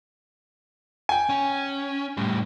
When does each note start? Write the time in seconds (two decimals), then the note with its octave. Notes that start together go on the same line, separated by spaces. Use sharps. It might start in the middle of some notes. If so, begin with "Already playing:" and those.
1.09 G5 G#5
1.29 C#4
2.17 A2 G3